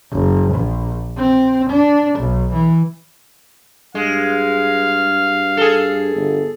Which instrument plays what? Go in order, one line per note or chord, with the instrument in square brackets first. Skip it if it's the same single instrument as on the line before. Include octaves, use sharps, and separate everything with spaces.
[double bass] F#1
A#1
C4
D4
B1
E3
[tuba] G2 [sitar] G#3 [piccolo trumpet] F5
[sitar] G#4 A4
[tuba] G1